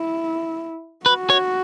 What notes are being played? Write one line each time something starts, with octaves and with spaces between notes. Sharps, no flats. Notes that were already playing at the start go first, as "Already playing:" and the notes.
Already playing: E4
F#4 B4
C#5